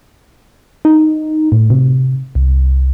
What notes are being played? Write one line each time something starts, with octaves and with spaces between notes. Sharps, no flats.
D#4
A2
C3
C2